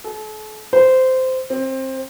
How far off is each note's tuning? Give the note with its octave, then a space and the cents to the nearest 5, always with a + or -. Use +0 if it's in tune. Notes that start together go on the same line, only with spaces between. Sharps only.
A4 -40
C5 -15
C4 +20